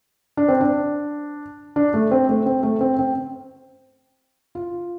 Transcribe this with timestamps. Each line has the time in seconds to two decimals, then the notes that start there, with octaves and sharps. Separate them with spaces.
0.37 D4
0.48 C4
0.61 D4
1.76 D4
1.94 A3
2.11 C4
2.29 A3
2.46 C4
2.63 A3
2.81 C4
2.99 C4
4.55 F4